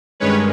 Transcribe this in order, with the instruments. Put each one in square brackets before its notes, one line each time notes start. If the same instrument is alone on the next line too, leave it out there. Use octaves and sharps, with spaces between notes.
[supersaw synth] G2 D#3 G#3 C#4 B4 C#5